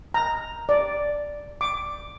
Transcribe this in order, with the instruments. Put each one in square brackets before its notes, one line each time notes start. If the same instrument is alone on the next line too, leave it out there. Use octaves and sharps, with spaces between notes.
[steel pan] A#5
D5
D6